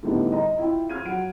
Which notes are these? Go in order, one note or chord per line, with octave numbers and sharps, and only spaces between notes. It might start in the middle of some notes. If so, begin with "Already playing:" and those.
A2 D3 G3 A3 B3 D#4
D#5 A#5
E4 F4 G5
F4 F6 G#6 D#7
F#3 F#5 D7